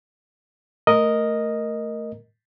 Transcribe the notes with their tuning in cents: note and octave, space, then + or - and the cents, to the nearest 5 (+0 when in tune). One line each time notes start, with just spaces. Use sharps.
A3 +10 A#4 +0 D#5 +0